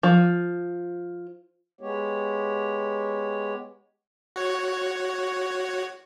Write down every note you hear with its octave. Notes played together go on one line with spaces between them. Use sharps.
F3
G#3 B3 G4 C#5
F#4 C#5